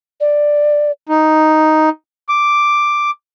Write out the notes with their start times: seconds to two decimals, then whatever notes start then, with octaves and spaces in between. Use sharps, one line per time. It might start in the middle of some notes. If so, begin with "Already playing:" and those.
0.20 D5
1.09 D#4
2.29 D6